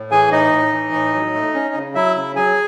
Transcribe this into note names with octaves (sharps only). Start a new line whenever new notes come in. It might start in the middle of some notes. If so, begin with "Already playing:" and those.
Already playing: A2
E3 G#4 G#5
A2 D#4 D#5
A2
E3
A2
F#3
A3
C#4
C#3
F#3 E4 E5
C#3
F#3 G#4 G#5